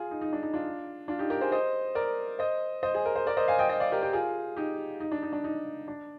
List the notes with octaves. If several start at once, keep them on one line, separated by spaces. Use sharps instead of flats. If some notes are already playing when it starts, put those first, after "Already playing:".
Already playing: F4 G#4
D#4
D#4
D4
D#4
D4 F4
D4 F4
D#4 G4
G4 A#4
G#4 C5
C5 D#5
A#4 D5
C5 D#5
C5 D#5
G#4
A#4
C5
A#4 D5
C5 D#5
F5 G#5
D#5 G5
D#5 G5
D5 F5
G4 A#4
G4 A#4
F4 G#4
D#4 G4
D#4
D4
D#4
D4
D#4
D4